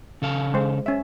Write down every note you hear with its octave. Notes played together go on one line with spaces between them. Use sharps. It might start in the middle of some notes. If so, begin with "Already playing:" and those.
C#3 A4 F5
G#3 C5
C#4 E5